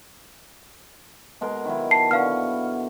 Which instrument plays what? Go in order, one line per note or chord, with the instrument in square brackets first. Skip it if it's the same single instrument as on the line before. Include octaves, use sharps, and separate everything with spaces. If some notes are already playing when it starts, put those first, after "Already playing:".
[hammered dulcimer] B2 G#3 A#4
D#3 F#3 E4
[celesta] A5 C7
[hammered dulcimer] B2 D3 C#6 [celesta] F5 F6